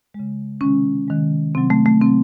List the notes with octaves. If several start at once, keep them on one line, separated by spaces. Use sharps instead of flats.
C#3 G#3
C3 D#3 G#3 C#4
C3 D#3 G#3
C3 F#3 C4
A3
A3
C3 C4
F#3